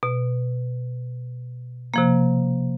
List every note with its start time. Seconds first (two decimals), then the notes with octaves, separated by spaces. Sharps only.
0.03 B2
1.94 C3 F3 A#3